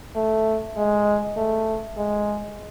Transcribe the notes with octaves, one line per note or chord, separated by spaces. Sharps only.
A3
G#3
A3
G#3